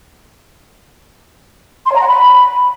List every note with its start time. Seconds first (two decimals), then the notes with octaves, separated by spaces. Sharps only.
1.86 C6
1.91 C#5
1.96 A#5
2.01 F#5
2.06 B5